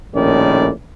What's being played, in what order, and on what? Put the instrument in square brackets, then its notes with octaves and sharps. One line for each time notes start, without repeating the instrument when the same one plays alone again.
[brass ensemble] A#1 A2 D#3 C#4 D5